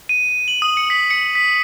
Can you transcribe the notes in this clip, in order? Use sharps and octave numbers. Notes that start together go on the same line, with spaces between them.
D#7
D#7
F#7
D#6
C#7
B6
C#7
B6